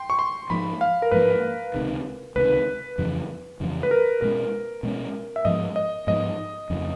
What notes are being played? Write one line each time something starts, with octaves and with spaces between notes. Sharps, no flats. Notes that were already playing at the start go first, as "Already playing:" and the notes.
Already playing: G5 C6
C#6
C6
G#2 F3 A#3 B5
F5
A#4
G#2 F3 A#3 B4
C#2 C3 D#3
C#2 C3 D#3 B4
F2 C#3 E3 G3
F2 C#3 E3 G3
B4
A#4
B2 G#3 C#4 A#4
B2 G#3 C#4
E5
G#2 F3 G#3 B3 D#5
D#5
G#2 F3 G#3 B3 D#5
F2 C#3 F3